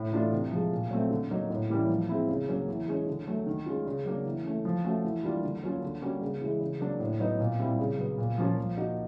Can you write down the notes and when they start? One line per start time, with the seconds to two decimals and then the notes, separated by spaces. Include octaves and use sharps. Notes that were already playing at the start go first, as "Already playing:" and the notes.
Already playing: A2
0.12 E3 A3 D4 F4
0.32 C3
0.52 F3 G#3
0.72 A#2
0.91 F#3 A3 C4
1.11 D3
1.30 F#3 A#3 D#4
1.50 A2
1.70 E3 G3 A#3 C#4
1.90 F3
2.09 G#3 C4 E4
2.29 C#3
2.49 F#3 A#3 C#4
2.68 E3
2.88 G#3 C#4
3.07 D3
3.27 F#3 A3
3.47 D#3
3.66 G#3 C#4 F4
3.87 C#3
4.05 F#3 A#3 D4
4.26 E3
4.44 A3 C#4
4.65 F3
4.84 A3 C#4 F#4
5.04 E3
5.23 G3 A#3 D4 F4
5.44 D3
5.63 F#3 A#3 C#4 F4
5.82 D3
6.02 G3 A#3 C#4 F#4
6.22 C#3
6.42 E3 G#3
6.61 C#3
6.80 F#3 A#3 D4
7.00 A2
7.20 F#3 B3 D#4
7.40 A#2
7.59 G3 C4 E4
7.79 C#3
7.98 F#3 B3
8.18 A#2
8.38 F3 A#3 C#4 F4
8.58 F3
8.77 A#3 D#4 F#4